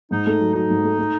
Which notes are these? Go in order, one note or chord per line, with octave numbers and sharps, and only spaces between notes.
G#2 D#4
A3
F#3
F#3 D#4
G#2
A3
A3